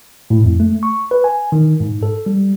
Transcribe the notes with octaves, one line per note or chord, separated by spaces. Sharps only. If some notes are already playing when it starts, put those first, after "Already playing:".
A2
F2
A3
C#6
B4
G#5
D#3
G#2
A4
G3